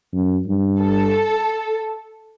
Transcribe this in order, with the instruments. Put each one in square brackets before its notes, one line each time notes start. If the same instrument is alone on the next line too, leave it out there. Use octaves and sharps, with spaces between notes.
[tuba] F#2
G2
[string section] A4